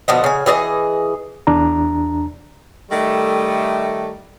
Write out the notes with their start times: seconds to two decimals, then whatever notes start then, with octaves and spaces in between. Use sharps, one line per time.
0.08 B2 D3 F3 D#5
0.24 C#3 G#5
0.46 E3 G#4 D5 D#5
1.47 E2 D4 A#5
2.91 D#3 G3 A3